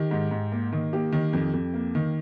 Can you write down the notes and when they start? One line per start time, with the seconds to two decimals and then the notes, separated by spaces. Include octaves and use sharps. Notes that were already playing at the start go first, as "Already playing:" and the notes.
Already playing: D#3 G4
0.11 G#2
0.31 G#2
0.52 A#3
0.73 D#3
0.93 A#3 G4
1.12 D#3
1.33 F2
1.54 F2
1.74 A#3
1.95 D#3